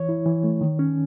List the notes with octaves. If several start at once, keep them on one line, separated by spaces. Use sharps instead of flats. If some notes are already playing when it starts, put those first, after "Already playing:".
Already playing: E3 C#5
E4
E3
A3
D#3
C#4